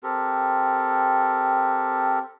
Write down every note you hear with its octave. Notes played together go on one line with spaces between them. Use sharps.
C4 G4 A4 A#4